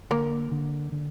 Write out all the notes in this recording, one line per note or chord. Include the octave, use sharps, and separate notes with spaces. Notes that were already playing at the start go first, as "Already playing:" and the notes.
D3 A#3 A#4
D3
D3